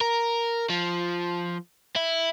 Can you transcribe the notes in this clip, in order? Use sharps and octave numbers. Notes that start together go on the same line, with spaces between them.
A#4
F3
E4